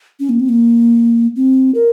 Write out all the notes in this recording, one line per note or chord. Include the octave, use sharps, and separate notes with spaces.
C#4
A#3
C4
A#3
C4
A#4